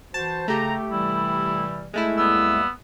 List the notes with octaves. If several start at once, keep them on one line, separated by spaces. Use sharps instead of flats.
E3 F#4 C5 A5
C#3 A3 G4 A#5
C3 E3 G3 E4
G#3 A3 E4
D#2 G3 B3 E6